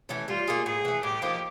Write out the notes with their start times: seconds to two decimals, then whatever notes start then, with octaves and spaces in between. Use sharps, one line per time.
0.09 E3 A3 C#4
0.28 G3 F4
0.48 A#3 D#4 G#4
0.66 A2 G#4
0.85 E3 A3
1.03 A2 G4
1.22 F3 A#3 D#4